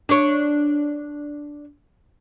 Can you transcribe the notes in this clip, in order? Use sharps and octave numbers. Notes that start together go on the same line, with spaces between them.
D4 C#5